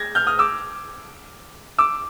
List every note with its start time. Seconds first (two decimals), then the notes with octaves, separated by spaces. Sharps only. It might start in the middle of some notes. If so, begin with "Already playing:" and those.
Already playing: G#6 A#6
0.15 F6 G6
0.27 D#6 F6
0.39 D6 E6
1.79 D6 E6